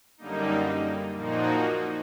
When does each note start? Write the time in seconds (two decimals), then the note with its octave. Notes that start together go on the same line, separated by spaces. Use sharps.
0.17 F#2 D3 G3 A#3 D#4
1.16 A#2 F3 A#3 D#4 F#4